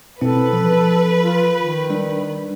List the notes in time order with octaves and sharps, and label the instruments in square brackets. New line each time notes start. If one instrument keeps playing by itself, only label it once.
[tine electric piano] B2 C4 E4 [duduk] A4 [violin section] B4
[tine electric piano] F3
[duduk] F4
D#3
[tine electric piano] G3 D4 D5